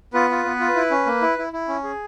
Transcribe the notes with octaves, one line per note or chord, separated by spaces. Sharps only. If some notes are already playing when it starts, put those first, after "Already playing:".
B3 F4 B4
F4
B3
F4
E4
C#4
A#3
E4
E4
E4
C#4
G#4